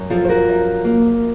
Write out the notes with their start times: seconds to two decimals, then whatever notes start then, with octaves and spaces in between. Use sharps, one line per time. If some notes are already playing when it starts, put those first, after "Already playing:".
Already playing: F#2
0.10 F3 F4 A4
0.25 C5
0.29 F#4 A#4
0.48 F#2
0.85 A#3